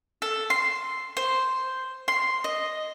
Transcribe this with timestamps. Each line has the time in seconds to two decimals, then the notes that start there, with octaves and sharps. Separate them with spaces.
0.22 A4
0.50 C6
1.17 C5
2.08 C6
2.44 D#5